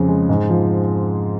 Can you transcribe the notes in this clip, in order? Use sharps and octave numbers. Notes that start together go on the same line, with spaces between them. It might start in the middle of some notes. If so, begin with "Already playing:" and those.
Already playing: F2 C#3
G#3
G#2
F3